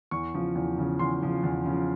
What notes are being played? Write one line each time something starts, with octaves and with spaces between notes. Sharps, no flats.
E2 C#6
C#3 F3
E2
C#3 F3
E2 C6
C#3 F3
E2
C#3 F3